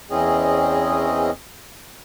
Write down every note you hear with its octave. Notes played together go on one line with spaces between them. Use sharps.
E2 E3 C4 C#4 G#4 D#5